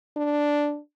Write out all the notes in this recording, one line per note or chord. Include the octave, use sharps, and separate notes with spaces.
D4